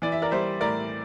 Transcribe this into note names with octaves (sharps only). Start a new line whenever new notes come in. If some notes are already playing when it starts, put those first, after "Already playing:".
E3 D5
E5
A#4 D5
G3 C5 E5
A2 A#4 D5